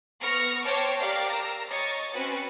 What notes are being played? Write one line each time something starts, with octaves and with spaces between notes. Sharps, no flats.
B3 C#6 F6 A#6
C5 C#5 G5 A5 D6
G4 A#4 D5 F5
A#5 E6
C#5 D#5 C#6 A6
C4 C#4 F#4 B4